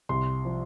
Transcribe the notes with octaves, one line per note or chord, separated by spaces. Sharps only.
C2 C6
F3